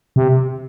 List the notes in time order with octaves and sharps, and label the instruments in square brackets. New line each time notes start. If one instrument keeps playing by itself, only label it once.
[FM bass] C3